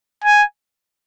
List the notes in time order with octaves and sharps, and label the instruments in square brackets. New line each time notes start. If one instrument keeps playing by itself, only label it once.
[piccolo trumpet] G#5